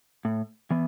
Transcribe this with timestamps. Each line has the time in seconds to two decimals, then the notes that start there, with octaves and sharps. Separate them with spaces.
0.25 A2
0.70 E3 B3